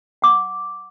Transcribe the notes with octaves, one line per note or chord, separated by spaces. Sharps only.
F#5 D6